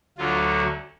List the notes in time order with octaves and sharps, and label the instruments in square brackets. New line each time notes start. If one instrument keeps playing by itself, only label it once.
[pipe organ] D2 D3 F#3 F4